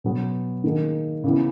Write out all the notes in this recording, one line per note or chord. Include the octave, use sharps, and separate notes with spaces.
B2 F#3 B3
D#3 A#3 D#4 G#4
C#3 E3 B3